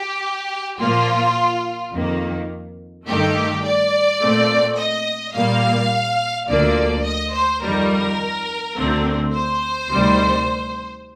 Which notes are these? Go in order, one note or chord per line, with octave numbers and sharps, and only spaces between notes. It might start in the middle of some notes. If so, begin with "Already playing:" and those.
Already playing: G4
A#2 F3 A#3 F4
F2 D#3 A#3
G2 D#3 A3 G4
D5
A#2 A3 C4
D#5
A#2 G3 A#3 F5
D2 D3 F3 A#3 D5
D#5
C5
F2 D#3 G3 A#4
D2 D3 A3 C4
C5
D2 C3 D#3 G3